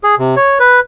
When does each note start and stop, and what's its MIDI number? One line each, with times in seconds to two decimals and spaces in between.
0.04 0.15 68
0.19 0.35 48
0.37 0.58 73
0.60 0.80 71